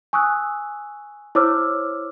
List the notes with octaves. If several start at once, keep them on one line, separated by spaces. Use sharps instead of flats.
G#5 C#6 D#6 E6 F#6
E4 C5 C#5 D6 E6 F6